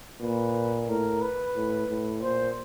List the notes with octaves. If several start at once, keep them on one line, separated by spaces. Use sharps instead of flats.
A#2 B4
A2 A#4
B4
A2
A2
A#2 C5